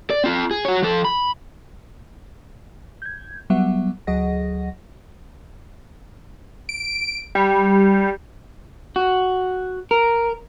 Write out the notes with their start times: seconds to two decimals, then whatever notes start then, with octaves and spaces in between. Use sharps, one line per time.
0.10 D5
0.24 C4 F4
0.51 G#4
0.65 F#4 C#5
0.83 F3 A4
1.05 B5
3.02 G6 G#6
3.50 F#3 G3 B3 E5 F#5
4.07 D2 F#3 G#4 D#5 F#5 A#6
6.69 D7
7.35 G3
8.96 F#4
9.91 A#4